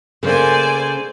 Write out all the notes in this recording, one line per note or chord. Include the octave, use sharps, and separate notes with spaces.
C#3 A3 A#3 C5 D5 G#5